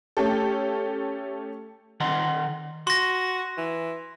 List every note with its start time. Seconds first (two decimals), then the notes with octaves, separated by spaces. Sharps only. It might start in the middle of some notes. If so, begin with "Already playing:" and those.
0.17 A3 C#4 G4 A4
2.00 D#3 D#5 F#5 A#5 C6
2.87 F#4 C6 A#6
3.58 E3